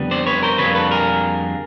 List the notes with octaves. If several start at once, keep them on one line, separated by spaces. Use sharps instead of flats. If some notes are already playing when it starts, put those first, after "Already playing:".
Already playing: F2 D3 G3 B3
C5 D5
B4 C#5
A#4 C5
F2 D3 G3 A#3 B4 C#5
A4 B4
G#4 A#4